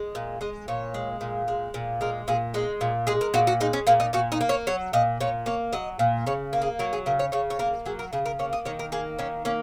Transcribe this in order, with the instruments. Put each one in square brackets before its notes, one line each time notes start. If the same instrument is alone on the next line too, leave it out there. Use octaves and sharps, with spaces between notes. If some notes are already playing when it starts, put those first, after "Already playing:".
Already playing: [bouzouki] G#3
A#2
G#3 D#5
A#2 C#5
G#3
A#2
G#3
A#2
G#3 A#4
A#2 G#4
G#3 D#4
A#2
G#3 G#4
A#4
A#2 F#4
F#4
G#3 D#4
C#4
A#2 A#3
D#4
A#2 F#4
D#4
A#3
C#5
F#3 C#5
A#2 D#5
A#2 C#5
A#3 C#5
F#3 D#5
A#2
C#3 C#5
A#3
G#4
F#3 A#4
G#4
C#3 A#4
C#5
C#3 C#5
C#5
A#3 A#4
F#3 G#4
A#4
C#3 G#4
A#4
A#3 C#5
D#5
D#3 C#5
A#4
A#3 G#4
D#3 C#4
A#3 C#4